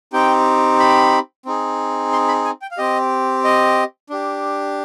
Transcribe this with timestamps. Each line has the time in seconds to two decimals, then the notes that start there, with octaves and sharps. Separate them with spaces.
0.13 C4 D#4 G4 G5
0.80 B5
1.46 C4 D#4 G#4
2.12 C6
2.28 B5
2.44 G#5
2.62 G5
2.71 F5
2.78 C4 G4 D#5
3.44 D#5
4.10 D4 G4